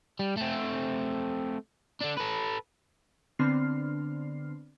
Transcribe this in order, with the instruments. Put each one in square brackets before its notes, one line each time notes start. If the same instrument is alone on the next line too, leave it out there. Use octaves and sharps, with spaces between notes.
[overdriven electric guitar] G3
A3 C4
D3 D4
A4 B4
[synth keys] D3 B3 C4 D4 F6 C7